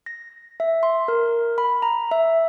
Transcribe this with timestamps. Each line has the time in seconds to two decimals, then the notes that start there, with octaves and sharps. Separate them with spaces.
0.06 A#6
0.60 E5
0.83 C6
1.08 A#4
1.58 B5
1.82 A#5
2.11 E5